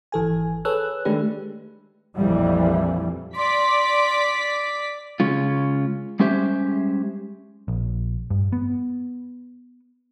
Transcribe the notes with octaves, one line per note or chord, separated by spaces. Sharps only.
G#1 E3 A4 G#5
G#4 A4 B4 C#5 E6 F#6
D#3 G#3 A3 D4 G4 B4
A#1 F2 E3 G3
D5 C6 D6 B6
C#3 G#3 C#4 F4
G3 G#3 C#4 G4 C5 E5
A#1
G2
B3